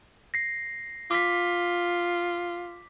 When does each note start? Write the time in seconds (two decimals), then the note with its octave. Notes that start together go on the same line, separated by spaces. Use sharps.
0.34 A#6 C7
1.11 F4 D6 B6